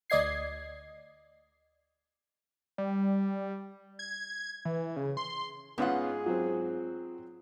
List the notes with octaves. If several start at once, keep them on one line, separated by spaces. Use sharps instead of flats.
D2 D5 D#5 G#6 C7
G3
G#6
E3
C#3
C6
G#2 G#3 B3 C#4 F4 G#4 F#5
F#3 C4 F4